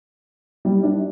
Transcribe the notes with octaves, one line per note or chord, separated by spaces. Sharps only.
G3
D4